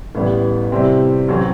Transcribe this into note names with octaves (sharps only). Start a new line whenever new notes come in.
A1 A2 G3 B3
C3 G3 C4 E4
A1 F#3 C4